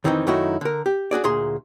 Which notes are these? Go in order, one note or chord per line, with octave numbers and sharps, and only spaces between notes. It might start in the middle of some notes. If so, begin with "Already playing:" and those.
F2 D#3 E3 C4 D4 D#4
F#2 D#3 A3 D#4 E4 F#4
D3 A#4
G4
D4 F#4 G#4 D5
D2 A#2 G#4 A#5 C6